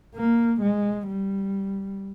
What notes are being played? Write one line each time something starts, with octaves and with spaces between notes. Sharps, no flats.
A#3
G#3
G3